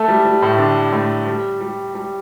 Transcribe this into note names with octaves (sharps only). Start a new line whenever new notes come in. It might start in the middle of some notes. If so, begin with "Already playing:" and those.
Already playing: A3 A4
G3
G3
A2 A3
D3 D4
A2 A3
G3
G3
G3